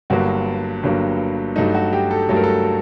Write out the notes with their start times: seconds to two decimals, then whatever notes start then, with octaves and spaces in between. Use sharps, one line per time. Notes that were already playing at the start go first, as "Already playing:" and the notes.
0.10 G1 G2 F#3 A#3 F#4
0.83 G1 G2 F#3 A#3
1.56 G2 F#3 A3 D#4
1.75 F#4
1.93 G4
2.11 A4
2.29 G2 F#3 A3 A4
2.37 A#4
2.44 A4